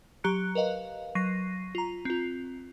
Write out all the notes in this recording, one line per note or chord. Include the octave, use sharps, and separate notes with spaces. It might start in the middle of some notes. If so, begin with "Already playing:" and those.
F#3 G4 A#5 F#6 C#7
A#4 B4 D#5 F5
F#3 C#6 A#6 C7 D#7
F4 A#5
C4 F4